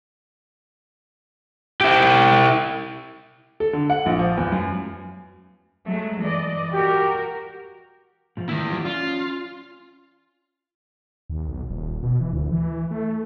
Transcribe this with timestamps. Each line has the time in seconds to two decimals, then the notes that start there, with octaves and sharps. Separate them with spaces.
1.81 E4 G4
3.60 A4
3.73 D3
3.90 F#5
4.06 A#1
4.19 F3
4.37 E2
4.52 F#2
5.87 F#3 G#3 A3
6.21 E3 D5 D#5
6.73 F#4 G4 A#4
8.37 G#2 F3
8.49 E2 D#3 A3 E4 A#4
8.70 F#3 F4 G4
8.85 C#4 F4 D5
11.30 D#2
11.48 B1
11.70 D#1
12.03 B2
12.20 E3
12.33 D2
12.52 E3
12.91 A3